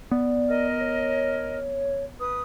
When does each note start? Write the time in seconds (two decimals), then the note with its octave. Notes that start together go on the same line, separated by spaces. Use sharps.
0.11 B3 D5
0.49 A#4 D#5 F6
0.80 C#5
2.19 B4 D#6